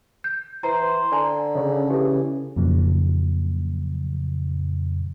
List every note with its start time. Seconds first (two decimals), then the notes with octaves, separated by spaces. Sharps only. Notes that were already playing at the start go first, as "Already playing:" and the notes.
0.24 G6
0.63 E3 C5 A#5
1.12 D3 D5 G#5 A#5
1.55 C#3
1.90 E3 G4 A4
2.56 F2 A#2 C#3 F#3